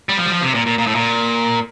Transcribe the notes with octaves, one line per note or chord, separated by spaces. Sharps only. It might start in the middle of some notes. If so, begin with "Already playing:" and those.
G3
F3
G3
F3
C3
A#2
A#2
A#2
A2
A#2